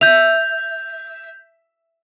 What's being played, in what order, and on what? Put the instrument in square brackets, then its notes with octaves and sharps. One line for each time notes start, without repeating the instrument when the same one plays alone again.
[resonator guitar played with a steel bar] E5 [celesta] G6 F7